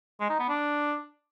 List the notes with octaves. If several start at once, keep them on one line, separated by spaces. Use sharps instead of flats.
G#3
D#4
B3
D4